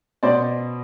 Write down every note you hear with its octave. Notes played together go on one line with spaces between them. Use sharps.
B2 C5 D5